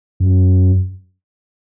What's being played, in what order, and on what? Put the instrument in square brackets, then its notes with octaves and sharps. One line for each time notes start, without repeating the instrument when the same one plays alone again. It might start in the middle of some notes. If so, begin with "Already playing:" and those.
[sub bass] F#2